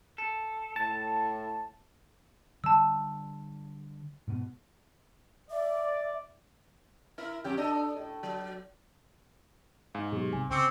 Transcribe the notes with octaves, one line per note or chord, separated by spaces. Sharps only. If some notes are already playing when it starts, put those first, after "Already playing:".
A4
A2 A5
D3 G3 A5 E6
G#2 B2 B3
D5 E5
E4 A#4 E5
F2 G4
D4 A4 D#5
A2
F#3
G#2 F5 G#5
B2 F#3 G4 G#4
C2 G#5
C#3 C4 C#6 D6 C#7